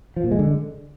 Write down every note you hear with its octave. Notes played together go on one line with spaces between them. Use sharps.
F3
A#2
G#3
D3